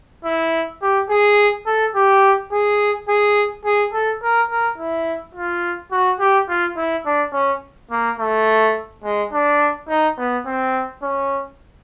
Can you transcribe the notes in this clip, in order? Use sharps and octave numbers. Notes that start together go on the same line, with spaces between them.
E4
G4
G#4
A4
G4
G#4
G#4
G#4
A4
A#4
A#4
E4
F4
F#4
G4
F4
E4
D4
C#4
A#3
A3
G#3
D4
D#4
B3
C4
C#4